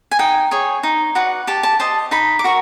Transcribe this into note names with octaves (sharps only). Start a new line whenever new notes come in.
G#5
D#4 G5
G#4 C#5
D#4
F#4 B4 D5
G4 A5
A5
C5 D#5 A5
D#4 B5
D6
F#4 A#4 C#6